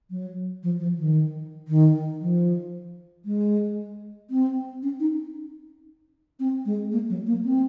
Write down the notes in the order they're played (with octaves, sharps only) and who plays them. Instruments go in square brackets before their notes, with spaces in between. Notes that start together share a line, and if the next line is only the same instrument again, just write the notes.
[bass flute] F#3
F3
F3
D#3
D#3
F3
G#3
C4
C#4
D#4
C4
G#3
A#3
F#3
A#3
C4